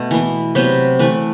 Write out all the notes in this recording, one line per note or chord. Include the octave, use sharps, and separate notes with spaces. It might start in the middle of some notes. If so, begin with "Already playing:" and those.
Already playing: B2 A3
E3 B3
C3 F#3 B3 B4
E3 A3 B4